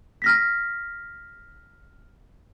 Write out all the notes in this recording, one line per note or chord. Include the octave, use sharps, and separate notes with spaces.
F6 A#6 B6